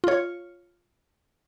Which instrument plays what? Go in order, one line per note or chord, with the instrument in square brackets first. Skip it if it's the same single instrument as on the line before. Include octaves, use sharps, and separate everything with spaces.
[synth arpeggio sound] F4 C#5